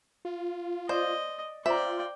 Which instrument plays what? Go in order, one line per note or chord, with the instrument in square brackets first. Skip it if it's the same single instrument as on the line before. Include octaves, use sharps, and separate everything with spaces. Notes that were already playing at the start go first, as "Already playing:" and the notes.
[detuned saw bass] F4
[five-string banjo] C5 [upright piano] D5 [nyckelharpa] D#5
[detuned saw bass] F4 [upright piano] C5 A#5 [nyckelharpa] D5 G5 [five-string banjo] E5